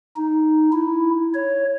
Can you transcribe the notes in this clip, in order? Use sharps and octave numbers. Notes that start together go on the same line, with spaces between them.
D#4
E4
C#5